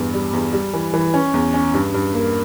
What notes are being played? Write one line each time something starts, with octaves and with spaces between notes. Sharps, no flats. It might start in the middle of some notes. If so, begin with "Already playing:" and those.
Already playing: E2 G2
G3
E2
G3
E3
E3
C#4
E2
C#4
G2
G2
A#3